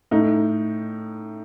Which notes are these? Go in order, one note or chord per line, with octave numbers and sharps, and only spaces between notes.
A2 D#4